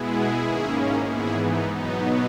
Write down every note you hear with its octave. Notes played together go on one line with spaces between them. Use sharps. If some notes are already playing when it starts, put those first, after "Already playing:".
Already playing: B2 G#3 B3 E4 G#4
G#2 D#3 A#3 C#4
G#2 E3 B3 E4 G#4
D#4
B2 F#3 B3 D#4